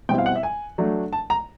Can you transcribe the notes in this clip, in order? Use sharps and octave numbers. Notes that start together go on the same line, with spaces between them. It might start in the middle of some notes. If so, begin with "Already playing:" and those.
B2 G3 C4 E4 G5
F5
F#5
E5
G#5
F#3 A3 D4
A5
A#5